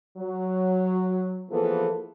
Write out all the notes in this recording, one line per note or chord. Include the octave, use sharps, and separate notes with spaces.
F#3
E3 F3 A#3 B3 G#4 A4